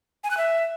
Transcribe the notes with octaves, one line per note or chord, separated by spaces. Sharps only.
G#5
F#6
E5